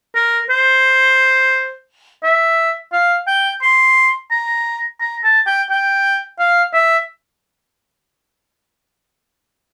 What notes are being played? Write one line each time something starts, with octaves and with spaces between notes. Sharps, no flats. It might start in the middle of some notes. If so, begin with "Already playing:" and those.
A#4
C5
E5
F5
G5
C6
A#5
A#5
A5
G5
G5
F5
E5